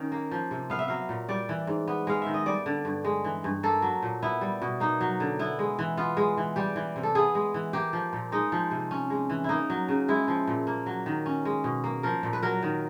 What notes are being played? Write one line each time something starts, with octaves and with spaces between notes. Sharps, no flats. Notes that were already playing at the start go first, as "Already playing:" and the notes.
Already playing: D#3 C#4
A#3
F3
C3
B3 F5
E5
F#3 F5
A#2
G3 D5
E3
G#2
B3
G#3 F5
D#3 E5
D#5
G3 D5
D3
G2
G#3
E3
G2
A#3 A4
F#3
A#2
B3 E4
G3
B2
A#3 D#4
F#3
D3
B3 E4
G#3
E3
B3 F4
G#3
E3
G3 G4
E3
C3
A4
B3 G#4
G#3
E3
A#3 G4
F3
A#2
G#3 D#4
F3
C3
C#4
G#3
E3
A#3 D#4 E4
F#3
C#3
G#3 E4
F3
A#2
A#3
F#3
D#3
C#4
G#3
B2
A#3
F3 A#4
A#2
B4
F#3 A#4
D#3